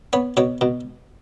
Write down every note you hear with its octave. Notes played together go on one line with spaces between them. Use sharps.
B3 C#5
B2 C#5
B2